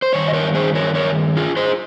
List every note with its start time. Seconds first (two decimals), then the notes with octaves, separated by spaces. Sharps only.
0.02 C5
0.12 G2 D#3 C#5
0.28 D#5
0.33 A#4 C#5
0.55 G#4 C5
0.75 A#4 C#5
0.95 A#4 C#5
1.37 F4 G#4
1.57 G#4 C5